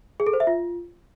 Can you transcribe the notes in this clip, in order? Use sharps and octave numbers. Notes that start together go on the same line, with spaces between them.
G#4
A4
C5
E5
F4